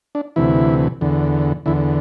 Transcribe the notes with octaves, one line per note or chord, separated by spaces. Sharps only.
D4
D2 C3 E3 E4
E2 D3
E2 D3 E4